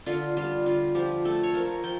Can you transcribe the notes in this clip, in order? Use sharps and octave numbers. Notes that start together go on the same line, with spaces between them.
D3 F4
G3 F4
D3 F4
F3 G4
A3 A4
C#5
F3 A#4
F3 G5